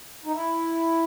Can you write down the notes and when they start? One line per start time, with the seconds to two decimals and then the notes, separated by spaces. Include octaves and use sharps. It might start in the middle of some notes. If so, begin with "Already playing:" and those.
0.25 D#4
0.32 E4